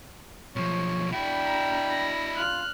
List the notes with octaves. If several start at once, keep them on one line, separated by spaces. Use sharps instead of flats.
B1 F3 C#5
D4 E4 F#4 G5 B5
A#5
A#6
F4 F6 F#6